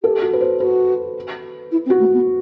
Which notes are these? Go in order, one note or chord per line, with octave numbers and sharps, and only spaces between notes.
G4 A4
F#4
B4
C5
F#4 B4
E4
C4
F#4
A3
B3